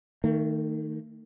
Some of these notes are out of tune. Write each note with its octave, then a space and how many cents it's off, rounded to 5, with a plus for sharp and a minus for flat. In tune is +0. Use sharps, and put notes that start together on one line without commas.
D#3 +0 A3 +40